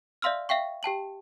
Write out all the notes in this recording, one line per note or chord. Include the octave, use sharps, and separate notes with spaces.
D5 E5 F5 C6 E6 F6
E5 F5 G5 C#6
G4 G5 A5 F#7